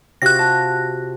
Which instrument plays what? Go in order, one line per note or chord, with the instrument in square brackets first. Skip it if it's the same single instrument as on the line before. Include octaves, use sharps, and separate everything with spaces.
[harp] C3 F4 F#4 [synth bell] F#6 A#6
[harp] A5